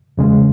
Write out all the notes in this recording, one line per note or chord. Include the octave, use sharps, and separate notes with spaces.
E2 C#3 G#3